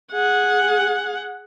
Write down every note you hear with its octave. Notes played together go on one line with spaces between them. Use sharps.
G#4 F#5